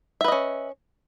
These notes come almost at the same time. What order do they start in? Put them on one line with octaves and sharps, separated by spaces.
E5 B4 D#5 C#4